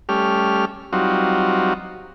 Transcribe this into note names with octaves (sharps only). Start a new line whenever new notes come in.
G3 A3 C#4 G4 F6
F#3 G3 C4 D#4 F4 F#4